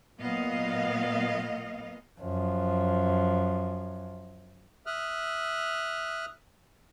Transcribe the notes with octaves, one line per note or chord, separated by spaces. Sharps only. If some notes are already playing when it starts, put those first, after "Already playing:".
A#2 F#3 B3 D#5 F5
F#2 F3
E5 D#6 F6 F#6